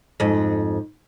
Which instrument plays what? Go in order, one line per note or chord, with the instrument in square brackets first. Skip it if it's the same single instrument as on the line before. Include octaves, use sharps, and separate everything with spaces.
[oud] F2 G#2